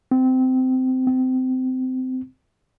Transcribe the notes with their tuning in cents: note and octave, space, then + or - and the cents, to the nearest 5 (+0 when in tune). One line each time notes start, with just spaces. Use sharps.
C4 -20
C4 -25